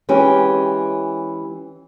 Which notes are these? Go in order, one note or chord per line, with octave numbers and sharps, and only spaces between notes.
E3 G#3 C#4 G4